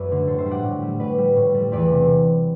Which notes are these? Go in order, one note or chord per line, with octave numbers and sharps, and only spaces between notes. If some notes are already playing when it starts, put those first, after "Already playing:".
Already playing: F#2 B4 D5 E5
D3 A3
A2 A4 C5
C5 E5
G3
D5 F#5
A2
G3
A2 B4 D5
G3
A2
G3
E2 B4 D5
C3 G3